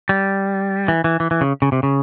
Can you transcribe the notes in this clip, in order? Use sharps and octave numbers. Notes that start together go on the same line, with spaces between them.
G3
E3
E3
E3
E3
C#3
C#3
C3
C#3